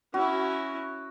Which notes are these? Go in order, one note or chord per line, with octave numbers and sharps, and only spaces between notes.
C#4 E4 F#4